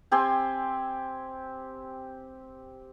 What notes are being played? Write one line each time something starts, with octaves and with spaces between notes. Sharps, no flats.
C4 G4 G#5 C6